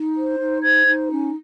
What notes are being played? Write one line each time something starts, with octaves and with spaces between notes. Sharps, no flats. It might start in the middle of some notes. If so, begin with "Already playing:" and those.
Already playing: D#4
C5
D#4
C5 G#6
D#4
C#4